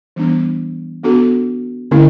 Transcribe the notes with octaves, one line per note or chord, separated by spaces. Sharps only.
E3 G3 B3 D4
B3 D4 F#4 A4
D3 A3 C#4 E4